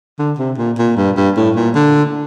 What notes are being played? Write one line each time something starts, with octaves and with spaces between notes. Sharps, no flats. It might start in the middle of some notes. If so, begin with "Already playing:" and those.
D3
C3
A#2
A#2
G2
G2
A2
A#2
D3